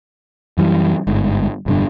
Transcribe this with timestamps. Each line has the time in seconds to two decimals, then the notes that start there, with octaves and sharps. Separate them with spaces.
0.58 F#2 E3 G3
1.07 G1 G#2
1.66 F1 G2 D3